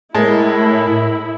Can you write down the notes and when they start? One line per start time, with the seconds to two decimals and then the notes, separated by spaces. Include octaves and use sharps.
0.15 A2 G#3 E4 A#4 A5